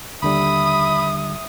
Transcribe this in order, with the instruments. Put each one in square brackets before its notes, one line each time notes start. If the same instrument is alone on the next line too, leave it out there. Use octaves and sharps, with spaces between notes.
[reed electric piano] D#2 D3 G3 [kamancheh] E5 D#6 [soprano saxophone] B5